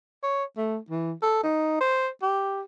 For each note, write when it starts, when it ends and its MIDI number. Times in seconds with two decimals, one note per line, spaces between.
0.23 0.44 73
0.57 0.78 57
0.90 1.12 52
1.22 1.40 69
1.43 1.77 63
1.81 2.09 72
2.22 2.62 67